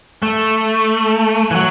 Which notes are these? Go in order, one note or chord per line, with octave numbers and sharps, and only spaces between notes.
A3
E3
F#3